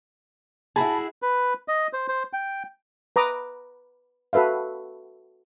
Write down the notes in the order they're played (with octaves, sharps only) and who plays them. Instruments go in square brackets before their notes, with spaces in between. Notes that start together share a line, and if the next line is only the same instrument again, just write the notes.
[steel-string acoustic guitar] E4 F#4 G#4 [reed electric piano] A5 B5
[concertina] B4
D#5
C5
C5
G5
[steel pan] B4 A#5 D6 D#6
F#4 A4 B4 E5 F5